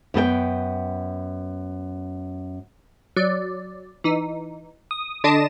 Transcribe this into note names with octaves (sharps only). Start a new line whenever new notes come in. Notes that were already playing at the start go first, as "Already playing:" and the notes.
F#2 B3 A4 G5
F#3 D5
E3 D#4
D#6
D3 D4 D#5 A5 D#6 E7